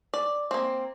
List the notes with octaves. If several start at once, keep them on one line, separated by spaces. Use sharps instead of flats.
D5
A#3 C4